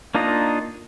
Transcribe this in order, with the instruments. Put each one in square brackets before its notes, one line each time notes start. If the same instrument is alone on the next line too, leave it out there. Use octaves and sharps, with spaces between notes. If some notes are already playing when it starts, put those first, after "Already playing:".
[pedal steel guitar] A#3 D4 D#4 F4 D#5